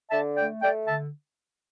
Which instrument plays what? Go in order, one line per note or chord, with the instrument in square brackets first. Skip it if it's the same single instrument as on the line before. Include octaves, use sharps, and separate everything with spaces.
[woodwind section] D3 E5 A5
A3 D5 G5
A3 D5 G5
D3 E5 A5